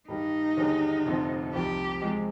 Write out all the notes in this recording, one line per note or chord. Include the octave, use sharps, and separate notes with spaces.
G2 D#3 G3 D#4
D#2 D3 G3 D4 G#4
F1 F2 D3 F3 C4
C2 C3 F3 G4
C3 F3 G#3